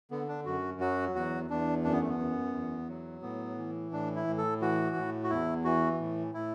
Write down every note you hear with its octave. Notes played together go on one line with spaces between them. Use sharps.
D3 B3
D4
F#2 F#4
F#3 F#4
E2 F#4
E2 D4
F#2 D4
B3
A3
B3
F#2
E2
F#3
A2 B3
E3
A2 D4
E4
A2
A4
E3 F#4
A2
F#4
E2 E4
E3 F#4
A2
A2 E4